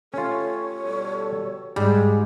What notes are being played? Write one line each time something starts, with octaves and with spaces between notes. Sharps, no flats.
A3 C#4 F4 G4 A4 C#5
B2 G3 A4
G#2 G3 G#4